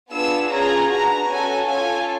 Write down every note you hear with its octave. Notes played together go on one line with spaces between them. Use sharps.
B3 D4 F4 G#4 E6
C#4 F4 G#4 A#5
B3 D4 F#4 A#5
C#4 F#4 A4 G#5
C#4 F4 A4 G#5